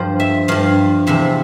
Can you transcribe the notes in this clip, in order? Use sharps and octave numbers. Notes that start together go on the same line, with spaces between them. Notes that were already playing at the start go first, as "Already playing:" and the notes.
Already playing: G2 F3 C5
E5
G2 F3 F5
E2 C3 F3 E5